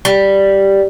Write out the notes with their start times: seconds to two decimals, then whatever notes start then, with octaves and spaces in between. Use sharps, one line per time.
0.05 G3